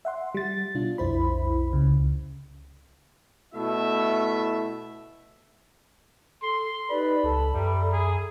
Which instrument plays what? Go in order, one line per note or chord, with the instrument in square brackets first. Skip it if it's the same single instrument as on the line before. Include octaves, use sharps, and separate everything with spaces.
[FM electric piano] E5 F#5 C6
G3 A6
B2 D4 F4
B1 F2 E4 C5 B5
C#2 C#3
[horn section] B2 A3 E4 E5
[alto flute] A4 [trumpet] C6
[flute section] D#4 G4 B4 [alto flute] D5 [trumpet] B5
[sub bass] C#2 [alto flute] A4 [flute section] A5
[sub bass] F#2 [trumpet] G3 [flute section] E5 A#5 B5
[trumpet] G#4